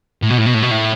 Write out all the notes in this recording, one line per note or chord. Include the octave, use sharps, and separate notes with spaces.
A2
B2
A2
B2
A2
B2
A2